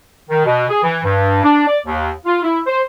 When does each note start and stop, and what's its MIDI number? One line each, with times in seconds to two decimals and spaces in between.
0.30 0.45 51
0.46 0.66 47
0.69 0.80 68
0.83 1.00 52
1.04 1.43 43
1.43 1.66 62
1.67 1.79 74
1.86 2.10 39
2.26 2.42 65
2.43 2.60 64
2.67 2.80 72